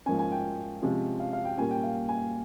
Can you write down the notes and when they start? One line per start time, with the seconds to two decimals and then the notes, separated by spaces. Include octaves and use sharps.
0.06 G#2 F3 A#3 C#4 G#5
0.19 G#5
0.32 G5
0.82 C3 F3 G#3 C#4
1.20 F5
1.33 F5
1.45 G5
1.58 A#2 G3 A#3 C#4 G#5
1.71 G5
1.84 F5
2.09 G#5